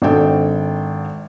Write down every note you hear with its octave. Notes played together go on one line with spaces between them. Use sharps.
G#1 D4 A4 G5